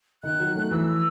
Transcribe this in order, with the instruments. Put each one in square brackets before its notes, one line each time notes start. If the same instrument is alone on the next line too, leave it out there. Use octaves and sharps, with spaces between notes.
[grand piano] D#3 [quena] F#6
[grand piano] F#3
A3
[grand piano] E3 [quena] E6